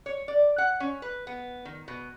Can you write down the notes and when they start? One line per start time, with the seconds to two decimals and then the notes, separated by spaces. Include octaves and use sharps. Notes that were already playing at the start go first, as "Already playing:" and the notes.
0.06 C#5
0.28 D5
0.58 F#5
0.80 C#4
1.02 B4
1.27 B3
1.65 D#3
1.88 B2